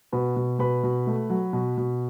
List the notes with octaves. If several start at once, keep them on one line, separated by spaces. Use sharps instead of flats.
B2 B4 B5
B2
B2 B4 B5
B2
A3
F#3
B2
B2